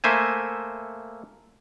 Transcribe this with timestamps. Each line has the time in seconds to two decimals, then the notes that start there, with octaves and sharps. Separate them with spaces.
0.04 A3 A#3 C5 E5 G#5